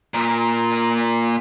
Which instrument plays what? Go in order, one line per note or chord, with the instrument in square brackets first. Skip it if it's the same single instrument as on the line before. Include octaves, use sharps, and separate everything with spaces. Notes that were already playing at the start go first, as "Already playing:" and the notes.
[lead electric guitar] A#2 A#4